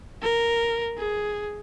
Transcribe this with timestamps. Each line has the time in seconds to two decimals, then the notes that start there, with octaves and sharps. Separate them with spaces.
0.22 A#4
0.98 G#4